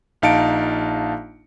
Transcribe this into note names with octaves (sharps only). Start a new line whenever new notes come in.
A#1 D#4 F5 A5 C#7 D7